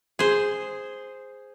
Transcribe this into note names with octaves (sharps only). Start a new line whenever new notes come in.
G#4 C5